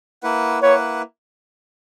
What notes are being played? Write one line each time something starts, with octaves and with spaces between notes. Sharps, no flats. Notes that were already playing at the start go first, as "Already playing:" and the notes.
A#3 E4 B4 F#5
A#3 E4 B4 C#5 F#5